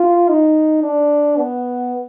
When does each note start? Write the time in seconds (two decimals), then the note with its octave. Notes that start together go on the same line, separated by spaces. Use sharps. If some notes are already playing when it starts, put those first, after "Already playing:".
Already playing: F4
0.29 D#4
0.83 D4
1.37 B3